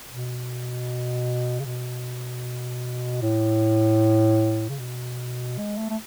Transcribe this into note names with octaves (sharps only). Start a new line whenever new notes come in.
B2
C#3
B2
A2
C#3
B2
G#3
A3
A3